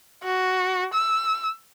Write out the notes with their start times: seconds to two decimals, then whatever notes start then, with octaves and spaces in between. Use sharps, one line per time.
0.23 F#4
0.94 E6